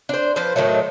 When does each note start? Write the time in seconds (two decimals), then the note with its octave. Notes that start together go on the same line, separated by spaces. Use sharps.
0.09 D4 C5
0.36 F3 B4 C5
0.56 A2 D#3 F#3 A3